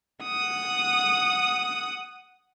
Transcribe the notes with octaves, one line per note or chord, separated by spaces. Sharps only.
F#5 D#6